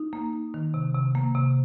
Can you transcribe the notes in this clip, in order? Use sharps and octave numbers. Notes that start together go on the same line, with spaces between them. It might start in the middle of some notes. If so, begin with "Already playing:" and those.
Already playing: D#4
A#3
D#4
D#3
C3
C3
A#3
C3